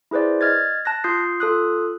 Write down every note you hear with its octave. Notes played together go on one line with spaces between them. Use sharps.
E4 G#4 B4 C5 D5
D#5 F6 G#6 A6
A5 F#6 A#6
F4 D#6 G6 C7
F4 A4 D#6 F#6